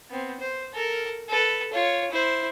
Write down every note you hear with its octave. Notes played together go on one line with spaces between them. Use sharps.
B3 C4
C5
A4 A#4
A4 B4
F4 C#5
E4 C5